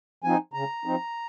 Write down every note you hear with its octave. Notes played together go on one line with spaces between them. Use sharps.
F3 C4 D#4 G#5
C#3 A#5
F3 C4 D#4